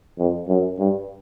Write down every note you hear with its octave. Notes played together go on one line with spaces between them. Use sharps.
F2
F#2
G2